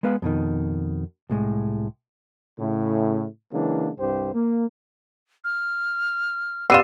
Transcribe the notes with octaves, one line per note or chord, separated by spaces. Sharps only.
G#3 B3 B4 F5
F2 B2 D#3
C2 A2 G#3
A2 C#3
C#3 E3 F#3 G#3 A#3 D4
C2 G2 G4 C5
A#3
F6
B3 F4 G4 D5 E6 C7 D#7 E7